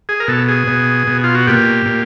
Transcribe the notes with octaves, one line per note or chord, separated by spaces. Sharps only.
G#4
A#4
B2 A4
G#4
B2
B2
F4
F#4
A#2 G4
A#2